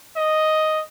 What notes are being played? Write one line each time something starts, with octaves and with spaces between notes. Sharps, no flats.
D#5